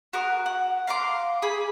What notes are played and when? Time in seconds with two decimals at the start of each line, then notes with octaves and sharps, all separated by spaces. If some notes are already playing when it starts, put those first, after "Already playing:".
0.13 F#4 A#4 A#5 D#6
0.46 F#5
0.87 F5 A#5 C6 D6
1.42 G#4 B5